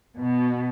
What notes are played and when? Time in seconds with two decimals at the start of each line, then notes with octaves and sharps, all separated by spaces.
0.18 B2